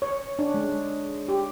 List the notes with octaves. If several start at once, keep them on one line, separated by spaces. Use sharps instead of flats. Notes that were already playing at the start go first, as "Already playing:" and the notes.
C#5
D4
G#3
G4